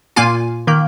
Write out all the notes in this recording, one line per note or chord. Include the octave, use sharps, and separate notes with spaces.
A#2 A#3 F4 G#5
D#3 A#3